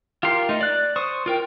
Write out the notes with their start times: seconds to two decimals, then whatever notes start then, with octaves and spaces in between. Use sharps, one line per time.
0.23 F4 G4 A#4 C6
0.49 A3 D#4
0.61 D5 F#6
0.96 C5 C#6 D#6
1.26 F4 A#4 G5